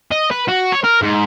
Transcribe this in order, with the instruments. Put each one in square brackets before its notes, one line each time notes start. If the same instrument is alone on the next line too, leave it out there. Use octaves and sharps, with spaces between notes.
[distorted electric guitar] D#5
B4
F#4
C#5
A#4
G#2